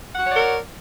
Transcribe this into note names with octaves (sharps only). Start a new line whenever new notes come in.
F#4 A#4 C#5 D5 F#5